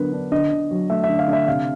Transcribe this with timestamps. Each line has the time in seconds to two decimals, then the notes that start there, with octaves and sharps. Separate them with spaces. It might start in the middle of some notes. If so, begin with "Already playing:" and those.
Already playing: D3 F#3 B3 A#4 B4
0.13 D4
0.32 D3 D#5
0.51 D3
0.71 F#3
0.90 A3 E5
1.04 E5
1.09 D3
1.19 F5
1.28 D3
1.33 E5
1.48 C3 F5